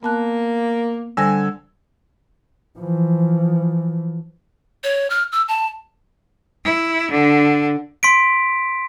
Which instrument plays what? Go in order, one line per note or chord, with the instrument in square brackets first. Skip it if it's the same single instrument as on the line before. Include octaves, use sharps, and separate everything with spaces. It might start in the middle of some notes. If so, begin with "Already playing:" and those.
[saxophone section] A#3 [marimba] B3 A5 F#6
[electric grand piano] D3 G#5 E6 [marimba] G3 C5 A#6
[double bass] E3 F3
[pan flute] C#5
F6
E6
A5
[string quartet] E4
D3
[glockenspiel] C6 B6 D7